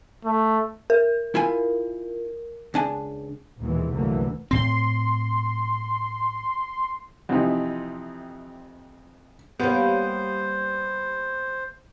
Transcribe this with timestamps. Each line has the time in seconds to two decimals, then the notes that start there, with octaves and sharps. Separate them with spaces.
0.25 A3
0.90 A#4
1.35 E4 F4 G#5
2.74 C#2 D4 G#5
3.58 A#1 D#2 B2 E3 G#3
3.91 C2 F#2 D3 E3 A3 A#3
4.51 A2 C4 C6
7.29 F2 C3 E3 D#4 E4
9.60 G3 A#3 B3 C#4 C5